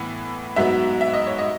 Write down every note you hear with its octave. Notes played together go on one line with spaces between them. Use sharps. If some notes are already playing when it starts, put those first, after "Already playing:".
Already playing: A2 E3 B3 F#5
G#2 F#3 B3 E5
E5
D#5
C#5
D#5